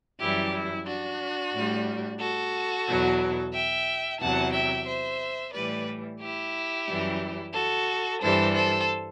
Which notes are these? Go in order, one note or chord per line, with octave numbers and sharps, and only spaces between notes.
F#2 E3 G3 E4 G4
E4
D4 F#4
A2 G3
F#4 A4
E2 B2 F#3
E5 G5
E2 C3 F#3 F#5 A5
E5 G5
C5 E5
A2 E3 G3 B4 D5
E4 G4
F#2 E3 G3
F#4 A4
G2 E3 G3 A4 C5
A4 C5